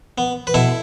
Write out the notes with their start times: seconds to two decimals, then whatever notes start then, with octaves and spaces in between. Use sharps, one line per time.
0.18 B3
0.47 B4
0.54 B2 E4 A4